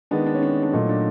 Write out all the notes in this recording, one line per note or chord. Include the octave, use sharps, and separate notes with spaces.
D#3 G#3 B3 D4
D4
C#4
D4
D4
A#2 F#3 A3 D#4
D4